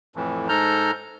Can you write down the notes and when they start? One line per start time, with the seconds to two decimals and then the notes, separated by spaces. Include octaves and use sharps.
0.16 F2 A2 E3
0.49 G#2 A4 A#5 F6 G6